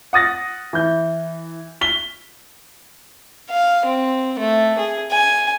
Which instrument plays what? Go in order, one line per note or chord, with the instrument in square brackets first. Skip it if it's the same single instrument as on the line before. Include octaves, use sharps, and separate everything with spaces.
[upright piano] F#5 D#6 A6 A#6
E3 G6
B6 G7
[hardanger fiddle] F5
C4
A3
G#4
G#5